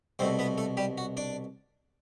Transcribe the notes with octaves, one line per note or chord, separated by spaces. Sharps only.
C2 B2 A3 C4 C5
B3 B4
A3 A4
G3 G4
F#4
D4 D5